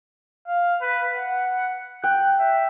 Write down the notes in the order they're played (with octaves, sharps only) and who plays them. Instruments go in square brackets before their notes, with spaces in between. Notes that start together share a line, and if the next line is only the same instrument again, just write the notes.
[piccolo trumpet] F5
B4
F#5
[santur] G5 [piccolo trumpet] F#6
[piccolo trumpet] E5